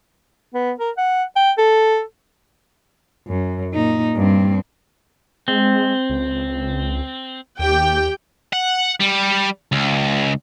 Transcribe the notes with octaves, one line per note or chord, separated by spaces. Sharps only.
B3
A#4
F#5
G5
A4
F#2
A#2 D#4
G2 C4
G#3 C4
C#2
D#2 G4 G5
F#5
G3
C#2